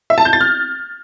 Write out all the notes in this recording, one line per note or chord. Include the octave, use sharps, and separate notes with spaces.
E5
A5
G6
A6
F6